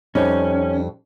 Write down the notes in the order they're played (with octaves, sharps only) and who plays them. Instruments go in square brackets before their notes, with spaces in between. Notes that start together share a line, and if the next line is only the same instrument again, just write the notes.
[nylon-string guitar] F2 G3 D#4 [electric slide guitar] C#4